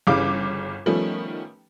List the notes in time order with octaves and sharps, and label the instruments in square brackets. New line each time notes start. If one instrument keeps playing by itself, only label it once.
[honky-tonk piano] G1 C#3 E3 G3 F5 D6
D#3 F3 G3 A3 B3 C#4